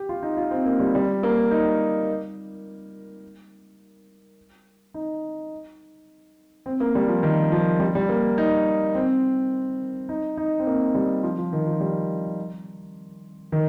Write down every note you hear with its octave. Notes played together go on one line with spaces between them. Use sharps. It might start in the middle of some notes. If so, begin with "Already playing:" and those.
Already playing: G4
F4
D#4
F4
C4
A#3
G3
G3
A#3
D#4
D#4
C4
A#3
G3
F3
D#3
F3
G3
G3
A#3
D#4
C4
D#4
D#4
C4
A#3
G3
F3
F3
D#3
F3
G3
D#3